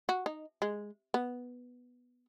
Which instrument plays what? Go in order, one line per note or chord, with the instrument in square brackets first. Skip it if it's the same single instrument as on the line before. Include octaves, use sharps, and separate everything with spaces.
[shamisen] F#4
D#4
G#3
B3